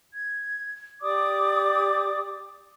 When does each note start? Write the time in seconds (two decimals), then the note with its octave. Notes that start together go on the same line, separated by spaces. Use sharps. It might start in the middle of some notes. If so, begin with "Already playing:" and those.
0.13 G#6
1.01 G4 D5 D6 D#6